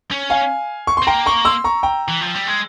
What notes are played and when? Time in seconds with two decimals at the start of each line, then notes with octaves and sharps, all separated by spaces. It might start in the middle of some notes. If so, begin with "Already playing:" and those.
0.11 C#4
0.30 F5 G#5
0.87 C#6
0.97 C6
1.02 C4
1.07 A#3 G5 A#5
1.26 A#5 C#6
1.45 C6 E6
1.64 A#5 C#6
1.83 G5 A#5
2.08 E3
2.21 F3
2.35 G3
2.47 G#3